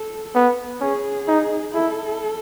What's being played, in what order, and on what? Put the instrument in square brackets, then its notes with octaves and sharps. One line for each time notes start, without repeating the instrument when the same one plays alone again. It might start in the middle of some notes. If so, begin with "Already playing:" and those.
Already playing: [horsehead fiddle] A4
[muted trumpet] B3
[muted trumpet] C#4 [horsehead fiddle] G#4
[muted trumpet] D#4
[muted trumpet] E4 [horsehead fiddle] A4